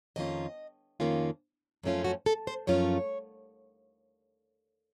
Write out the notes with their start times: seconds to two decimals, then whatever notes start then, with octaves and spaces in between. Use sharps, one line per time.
0.16 F2 D#3 A#3 C#4 F4 D#5
1.00 F2 D#3 A#3 C#4 F4
1.83 F#2 F3 A3 C#4 F4
2.04 F#4
2.26 A4
2.47 C5
2.67 F#2 F3 A3 C#4 F4 C#5